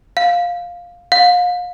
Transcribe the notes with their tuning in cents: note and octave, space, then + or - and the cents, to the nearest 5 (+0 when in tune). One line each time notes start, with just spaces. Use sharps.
F5 +5
F5 +35